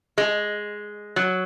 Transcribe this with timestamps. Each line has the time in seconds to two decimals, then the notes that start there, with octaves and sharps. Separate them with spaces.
0.18 G#3
1.16 F#3